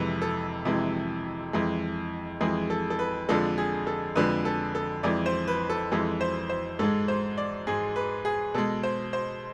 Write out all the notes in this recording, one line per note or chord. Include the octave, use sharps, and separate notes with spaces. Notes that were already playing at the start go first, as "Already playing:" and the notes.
Already playing: F2 C3 E3 G#3 B4
A4
F2 C3 E3 G#3
F2 E3 G#3
F2 E3 G#3 G#4
A4
A4
B4
F2 D3 F3 G#3 A4
G#4
A4
F2 D3 F3 G#3 B4
A4
A4
F2 E3 G#3 D5
C5
B4
A4
F2 E3 G#3 A4
C5
C5
G#2 G#3 A4
C5
D5
G#2 G#3 G#4
B4
G#4
B2 G#3 A4
C5
C5